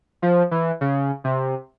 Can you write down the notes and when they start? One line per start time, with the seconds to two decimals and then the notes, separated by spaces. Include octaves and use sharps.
0.22 F3
0.51 E3
0.81 C#3
1.24 C3